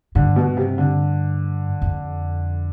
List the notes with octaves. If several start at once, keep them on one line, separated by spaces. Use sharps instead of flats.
G2 D3
B2
C3
D3
F2